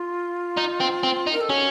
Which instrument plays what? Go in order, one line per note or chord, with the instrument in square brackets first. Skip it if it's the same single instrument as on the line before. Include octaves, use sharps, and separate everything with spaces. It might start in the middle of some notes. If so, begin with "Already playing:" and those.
Already playing: [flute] F4
[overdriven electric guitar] D#4
C4
C4
D#4
[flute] A#4
A4
[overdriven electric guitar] C#4 [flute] F#4